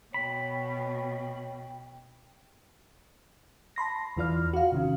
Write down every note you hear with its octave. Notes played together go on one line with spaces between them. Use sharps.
B2 C#5 G5 B5
A5 B5 C6 A#6
E2 E3 F4 D5 F6
F#4 F5
C3 D#3 C#4